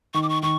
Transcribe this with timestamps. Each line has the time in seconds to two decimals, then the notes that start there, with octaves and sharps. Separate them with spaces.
0.14 D#3 C#6
0.23 D6
0.29 C#6
0.42 D#3 C#6